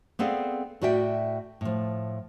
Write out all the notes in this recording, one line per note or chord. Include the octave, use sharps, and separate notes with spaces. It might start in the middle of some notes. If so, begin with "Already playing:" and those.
B3 C4 G#4 A4 D5 F5
A2 F#4 D5 E5 G5
A2 F3